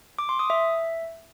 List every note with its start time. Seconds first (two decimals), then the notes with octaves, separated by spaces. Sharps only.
0.19 D6
0.29 C6
0.39 D#6
0.50 E5